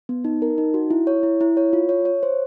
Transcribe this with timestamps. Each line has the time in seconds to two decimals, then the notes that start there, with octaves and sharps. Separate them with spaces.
0.09 B3
0.25 D#4
0.42 A#4
0.58 D#4
0.74 F#4
0.90 E4
1.07 C#5
1.23 E4
1.41 E4
1.57 C#5
1.73 F4
1.89 C#5
2.05 C#5
2.23 C5